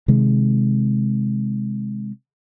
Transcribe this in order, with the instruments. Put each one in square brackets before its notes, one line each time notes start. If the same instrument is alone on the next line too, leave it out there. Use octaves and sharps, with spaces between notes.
[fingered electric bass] C3 D#3 G#3